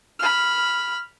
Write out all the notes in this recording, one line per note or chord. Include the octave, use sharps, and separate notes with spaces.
B5 F6